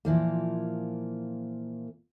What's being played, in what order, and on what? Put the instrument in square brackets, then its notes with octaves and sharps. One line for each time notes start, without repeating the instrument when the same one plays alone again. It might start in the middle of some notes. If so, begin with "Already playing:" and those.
[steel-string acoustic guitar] A#2 E3 F3 A#3